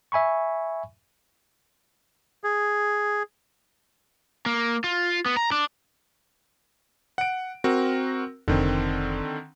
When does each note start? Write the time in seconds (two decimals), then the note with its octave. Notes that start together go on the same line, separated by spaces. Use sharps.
0.12 E5 G#5 B5 C#6
2.44 G#4
4.46 A#3
4.84 F4
5.26 B3
5.37 A#5
5.52 D4
7.18 F#5 D7
7.64 C4 F#4 A#4
8.48 F1 D3 D#3 C4